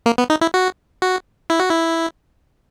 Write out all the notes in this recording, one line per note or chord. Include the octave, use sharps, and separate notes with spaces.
A#3
B3
D#4
E4
F#4
F#4
E4
F#4
E4